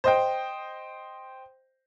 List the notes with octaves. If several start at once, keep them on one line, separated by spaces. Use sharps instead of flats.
C5 D#5 G5